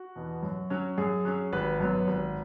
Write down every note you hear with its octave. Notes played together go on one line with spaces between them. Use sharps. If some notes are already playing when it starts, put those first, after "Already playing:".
Already playing: F#4
E2 B2 B3
F#2
F#3 C#4
F#2 G#4
F#3 C#4
G#1 B4
F#2 F#3 B3
G#1